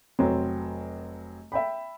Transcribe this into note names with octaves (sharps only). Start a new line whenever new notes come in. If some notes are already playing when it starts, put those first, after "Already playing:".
F1 F#3 C4
E5 G5 B5